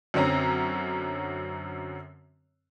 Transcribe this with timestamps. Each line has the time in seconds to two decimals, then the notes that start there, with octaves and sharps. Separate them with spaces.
0.14 F#2 D3 C4 C#4 A#5